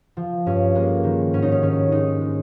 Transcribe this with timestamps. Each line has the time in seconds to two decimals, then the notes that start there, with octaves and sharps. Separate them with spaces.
0.17 F3
0.46 G2 C#4
0.75 G#3 A#3
1.04 D#3
1.33 G#2 C#4
1.42 D#4
1.52 C#4
1.62 D#3 C#4
1.92 G#3 D#4
2.21 G#3